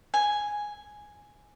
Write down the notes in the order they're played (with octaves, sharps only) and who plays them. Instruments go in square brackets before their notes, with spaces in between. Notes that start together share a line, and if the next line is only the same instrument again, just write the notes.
[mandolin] G#5